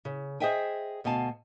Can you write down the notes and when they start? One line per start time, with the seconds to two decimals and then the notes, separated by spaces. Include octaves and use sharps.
0.05 C#3
0.40 G#4 C5 D#5 E5 G5 G#5
1.04 D2 B2 F5 G#5 A5